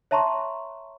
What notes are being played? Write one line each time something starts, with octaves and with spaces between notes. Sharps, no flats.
C#5 E5 A5 A#5 C6 C#6